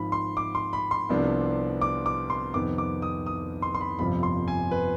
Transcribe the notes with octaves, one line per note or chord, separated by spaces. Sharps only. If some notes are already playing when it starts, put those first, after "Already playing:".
Already playing: G#1 G#2 F3 B5
C6
D6
C6
B5
C6
C2 C3 F3 B3 D4
D6
D6
C6
F2 C3 D#3 B3 D6
D6
D#6
D#6
C6
C6
B5
G1 F2 C3 F3 B5
C6
G#5
B4